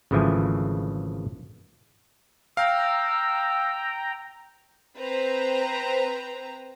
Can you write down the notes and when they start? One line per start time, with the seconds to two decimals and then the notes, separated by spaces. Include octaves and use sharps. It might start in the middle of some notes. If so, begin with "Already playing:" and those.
0.11 G#1 C#3 E3 F3 A3 G#5
2.57 F5 G5 A#5 E6
4.97 C4 B4 C5 A#5